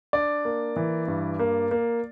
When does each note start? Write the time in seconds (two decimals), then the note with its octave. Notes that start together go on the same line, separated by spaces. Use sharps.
0.13 D4 D5
0.45 A#3
0.76 E3
1.08 G2
1.39 A#3
1.71 A#3